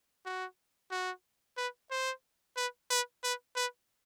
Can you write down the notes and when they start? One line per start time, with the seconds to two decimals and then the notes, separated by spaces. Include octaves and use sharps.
0.26 F#4
0.91 F#4
1.57 B4
1.91 C5
2.57 B4
2.91 B4
3.24 B4
3.56 B4